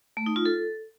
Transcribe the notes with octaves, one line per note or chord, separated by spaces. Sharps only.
A3
D#4
F4
A4